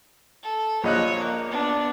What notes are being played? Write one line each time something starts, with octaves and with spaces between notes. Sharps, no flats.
A4
A#1 C#5 D#5 F#6
A#3
B3 D4